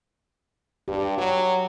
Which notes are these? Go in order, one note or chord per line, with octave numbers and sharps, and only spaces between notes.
G2 G4
F#3 F#4